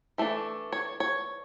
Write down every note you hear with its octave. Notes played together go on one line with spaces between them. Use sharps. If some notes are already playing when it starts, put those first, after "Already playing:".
E3 A3 D4
C#5
C#5